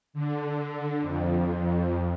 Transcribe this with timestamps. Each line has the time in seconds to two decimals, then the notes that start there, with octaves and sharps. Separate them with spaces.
0.13 D3
1.01 F2